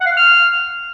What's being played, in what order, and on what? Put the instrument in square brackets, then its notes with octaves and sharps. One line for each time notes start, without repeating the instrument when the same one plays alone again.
[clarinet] F#5
F5
F#5
F6